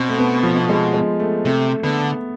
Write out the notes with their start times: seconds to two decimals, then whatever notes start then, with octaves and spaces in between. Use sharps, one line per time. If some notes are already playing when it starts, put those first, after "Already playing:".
Already playing: B2 C4
0.09 A3
0.19 B3
0.43 F3
0.69 G#3
0.94 G#3
1.20 A3
1.45 C3 A3
1.83 D3 B3